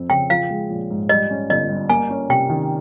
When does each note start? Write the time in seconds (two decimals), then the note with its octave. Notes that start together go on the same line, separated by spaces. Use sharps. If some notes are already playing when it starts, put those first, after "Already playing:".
Already playing: F2 F3 C4
0.10 C#3 G5
0.30 F3 F5
0.50 G#3
0.70 A#1
0.91 G#2
1.09 G3 D#5
1.30 C#4
1.50 G1 D#5
1.69 G2
1.89 A#3 G#5
2.10 C#4
2.29 C3 G5
2.49 D#3